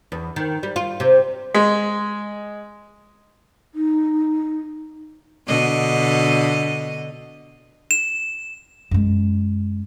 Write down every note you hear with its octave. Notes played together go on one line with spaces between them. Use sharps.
E2
D#3
G3
F4
C3
G#3
D#4
B2 D3 D#5
E7
F#2 G#3